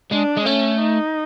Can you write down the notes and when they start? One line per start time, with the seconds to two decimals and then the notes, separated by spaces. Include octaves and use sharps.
0.12 G#3 D4
0.37 G#3
0.46 A3 C#4
0.81 D#4